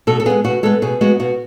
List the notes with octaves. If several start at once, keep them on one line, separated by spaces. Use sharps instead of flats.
B2 A4
A4
G#3 B3 G#4
B2 F#4
G#3 B3 A4
B2 G#4
G#3 B3 F#4
B2 F#4